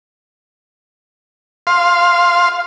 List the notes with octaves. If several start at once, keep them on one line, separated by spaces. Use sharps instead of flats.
F5 C6